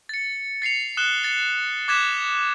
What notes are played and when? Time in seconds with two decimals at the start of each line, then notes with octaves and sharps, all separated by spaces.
0.09 A6 C#7
0.62 A6 C7 C#7 F7
0.97 D#6 F#6 E7 G7
1.23 A6 C#7
1.88 D6 F#6 G#6 A6 B6 E7